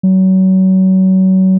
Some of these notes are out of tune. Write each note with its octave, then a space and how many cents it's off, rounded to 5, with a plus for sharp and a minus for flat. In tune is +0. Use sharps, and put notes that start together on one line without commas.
F#3 +30